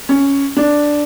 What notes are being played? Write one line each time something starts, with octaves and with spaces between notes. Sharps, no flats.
C#4
D4